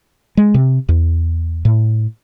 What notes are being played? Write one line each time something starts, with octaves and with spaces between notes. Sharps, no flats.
G#3
C3
E2
A2